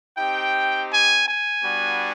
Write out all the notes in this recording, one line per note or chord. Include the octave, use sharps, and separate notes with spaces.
C4 D#4 G4 G5
G#5
G#5
G3 B3 D4 F#4